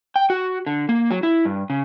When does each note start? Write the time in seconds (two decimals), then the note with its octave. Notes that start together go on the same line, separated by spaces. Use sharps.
0.16 G5
0.30 F#4
0.66 D3
0.89 A#3
1.11 F#3
1.23 E4
1.45 G2
1.70 C#3